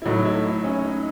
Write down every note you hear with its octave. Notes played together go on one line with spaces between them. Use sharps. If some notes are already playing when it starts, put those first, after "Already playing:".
E4
A2 F#3 A3 D#4
E4
D#4
C#4
D#4